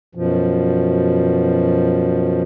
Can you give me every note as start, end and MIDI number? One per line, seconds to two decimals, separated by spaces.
0.15 2.42 42
0.15 2.42 47
0.15 2.42 53